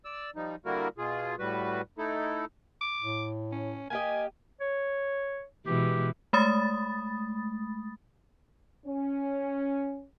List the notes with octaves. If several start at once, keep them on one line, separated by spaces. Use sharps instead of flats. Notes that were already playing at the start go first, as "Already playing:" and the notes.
D5 E6
F3 G3 D#4
D3 G3 A#3 E4 F#4 A#4
B2 F4 G#4
A2 G3 F#4 B4
A3 D#4 E4 A4
D6
A2
C#4
A#3 G4 D#5 G#5
C#5
B2 E3 G#3 G4
G#3 A3 B5 D#6 A6
C#4